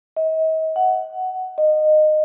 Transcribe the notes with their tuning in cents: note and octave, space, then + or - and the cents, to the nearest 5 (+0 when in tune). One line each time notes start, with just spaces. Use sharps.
D#5 +40
F#5 +10
D#5 -20